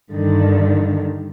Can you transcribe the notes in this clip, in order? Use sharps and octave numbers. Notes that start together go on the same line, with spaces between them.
G2 D3 D#3